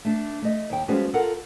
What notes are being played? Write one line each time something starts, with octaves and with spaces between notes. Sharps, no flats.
A3 D4
A3 D#5
D#2 G5
F3 G3 G#3 B3 C#4 F#4
F4 A4 A#4 F#5